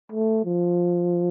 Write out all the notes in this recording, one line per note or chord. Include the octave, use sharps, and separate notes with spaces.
A3
F3